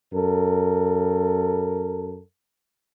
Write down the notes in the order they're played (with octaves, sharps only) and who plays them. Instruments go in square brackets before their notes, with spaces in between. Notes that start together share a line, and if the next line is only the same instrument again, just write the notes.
[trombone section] F#2 A4 A#4